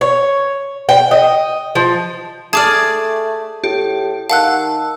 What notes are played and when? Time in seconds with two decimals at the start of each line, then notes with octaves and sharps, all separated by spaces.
0.01 C#5
0.89 G5
1.11 D#5
1.75 F3
2.53 A3 G#4 D5 A5 D6 F6
3.64 A2 G4
4.30 D#3 F5 F#5 A5 E6 F#6